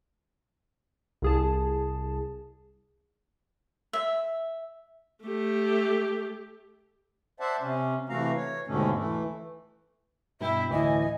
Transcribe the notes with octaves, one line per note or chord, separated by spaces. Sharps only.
C2 G#4 A5
E5
A3 G4
C5 D5 E5 F#5 A5
C3 C#4
C3 E3 A3 F#4 F5 A#5
C#5
D#2 G#2 B2 D3 A3 C#4
E3 A3
G2 B2 E4 E5 G5
D2 A2 E3 D#5 G#5